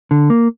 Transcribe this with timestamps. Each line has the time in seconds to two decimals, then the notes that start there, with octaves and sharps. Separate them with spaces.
0.11 D3
0.30 A#3